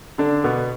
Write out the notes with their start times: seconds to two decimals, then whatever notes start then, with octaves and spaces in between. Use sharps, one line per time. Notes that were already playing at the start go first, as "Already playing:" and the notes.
0.18 D3 D4
0.44 B2 B3